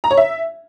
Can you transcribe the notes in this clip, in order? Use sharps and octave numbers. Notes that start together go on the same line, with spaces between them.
A#5
C#5
E5